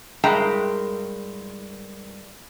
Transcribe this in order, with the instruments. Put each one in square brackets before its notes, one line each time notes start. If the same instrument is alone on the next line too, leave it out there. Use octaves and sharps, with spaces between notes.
[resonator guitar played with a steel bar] G2 G#3 E4 A#4 G5 A#5